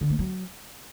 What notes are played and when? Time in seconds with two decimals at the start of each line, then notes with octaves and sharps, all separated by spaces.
0.01 D3
0.10 A3
0.19 F#3